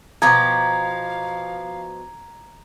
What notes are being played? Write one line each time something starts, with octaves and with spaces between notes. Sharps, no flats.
B2 F3 G4 F5 A#5 G#6